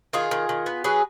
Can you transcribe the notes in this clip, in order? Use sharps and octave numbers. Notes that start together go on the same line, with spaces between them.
D#3 F4 G#4
D#3
D#3
B3
F#3 G#4 B4